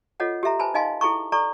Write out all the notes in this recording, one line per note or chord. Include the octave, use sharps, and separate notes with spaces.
F4 A4 C#5 D#5 F#5
G4 A4 E5 A#5
B4 C5 G#5 A5 B5
D#4 D#5 F5 G#5 A5 C6
E4 G#4 A4 A#5 C#6
A4 D5 A#5 C#6